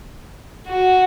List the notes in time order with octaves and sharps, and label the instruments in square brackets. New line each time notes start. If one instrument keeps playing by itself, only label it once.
[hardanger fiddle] F#4